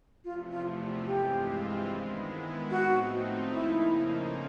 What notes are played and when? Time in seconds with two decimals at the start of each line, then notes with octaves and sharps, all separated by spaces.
0.25 E2 C3 F3 A3 F4
0.52 F4
1.06 G2 E3 G#3 C4 F4 G4
1.88 D#3 G#3 B3 E4
2.70 A2 F3 A3 C4 D#4 F#4
3.52 F2 C#3 F3 A#3 D#4 E4